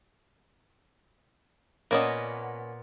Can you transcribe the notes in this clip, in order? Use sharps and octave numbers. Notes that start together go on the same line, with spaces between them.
A#2 A#3 B3 C#4 D#5